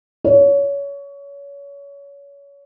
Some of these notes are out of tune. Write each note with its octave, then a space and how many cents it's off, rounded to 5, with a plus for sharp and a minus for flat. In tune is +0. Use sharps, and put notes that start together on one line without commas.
C#5 +25